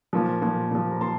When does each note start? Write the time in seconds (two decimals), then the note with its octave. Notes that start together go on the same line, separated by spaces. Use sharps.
0.13 A#2 F3
0.42 A#2 F3
0.71 A#2 F3
0.91 A#5
1.01 A#2 A5 C6